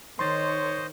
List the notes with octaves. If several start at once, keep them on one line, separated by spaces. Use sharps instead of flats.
D#3 C5 C#5 D#5 C6 A6